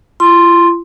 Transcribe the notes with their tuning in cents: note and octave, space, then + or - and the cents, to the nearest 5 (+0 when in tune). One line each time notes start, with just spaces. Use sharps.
F4 -45 C6 +0